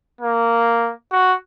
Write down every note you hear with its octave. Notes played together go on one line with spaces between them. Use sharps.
A#3
F#4